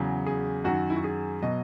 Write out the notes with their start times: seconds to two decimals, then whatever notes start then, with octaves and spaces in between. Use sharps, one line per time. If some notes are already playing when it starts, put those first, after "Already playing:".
Already playing: E2 C#3 F#3
0.27 G#4
0.64 F#2 D#3 F#3 F#4
0.90 E4
0.96 F#4
1.04 G#4
1.42 B2 F#3 D#5